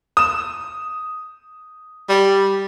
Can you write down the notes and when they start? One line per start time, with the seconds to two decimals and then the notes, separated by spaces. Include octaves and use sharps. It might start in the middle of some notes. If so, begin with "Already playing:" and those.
0.17 D#6 E7
2.09 G3